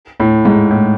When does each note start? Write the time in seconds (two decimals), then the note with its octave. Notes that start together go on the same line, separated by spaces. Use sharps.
0.20 A2
0.45 G#2
0.71 A2